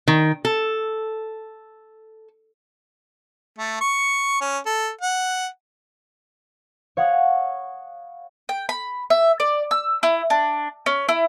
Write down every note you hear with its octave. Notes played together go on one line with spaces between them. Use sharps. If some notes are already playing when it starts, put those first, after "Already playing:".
D#3
A4
A3
C#6
C#4
A4
F#5
C#5 F5 F#5 D#6
G5
B5
E5
D5
E6
E4
D4
C#4
E4